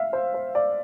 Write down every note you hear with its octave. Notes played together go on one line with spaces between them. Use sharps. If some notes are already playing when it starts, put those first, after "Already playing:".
Already playing: E5 F5
C5
C5
D5